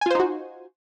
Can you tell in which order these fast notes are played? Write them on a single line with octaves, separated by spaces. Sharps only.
G#5 F4 C5 D#4 F#4